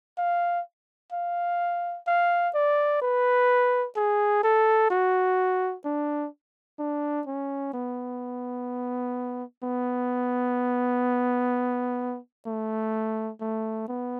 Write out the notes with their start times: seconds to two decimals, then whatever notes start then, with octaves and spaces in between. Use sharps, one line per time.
0.18 F5
1.13 F5
2.07 F5
2.54 D5
3.02 B4
3.96 G#4
4.43 A4
4.90 F#4
5.85 D4
6.79 D4
7.27 C#4
7.73 B3
9.63 B3
12.47 A3
13.41 A3
13.88 B3